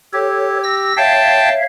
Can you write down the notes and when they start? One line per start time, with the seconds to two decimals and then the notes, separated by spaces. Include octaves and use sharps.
0.13 G4 A4 C#5
0.64 E6 A#6
0.97 C#5 E5 F5 G5 A5